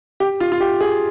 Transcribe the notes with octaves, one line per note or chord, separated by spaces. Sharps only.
G4
F4
F4
G4
G#4